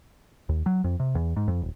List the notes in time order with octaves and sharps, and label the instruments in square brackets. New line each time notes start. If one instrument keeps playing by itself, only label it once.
[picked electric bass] D#2
F#3
F2
C3
E2
G#2
F2
D#1